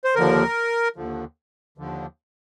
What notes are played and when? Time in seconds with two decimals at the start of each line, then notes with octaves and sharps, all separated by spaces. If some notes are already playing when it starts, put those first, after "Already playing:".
0.05 C5
0.15 D#2 D3 F3 A#4
0.96 D#2 D3 F3
1.78 D#2 D3 F3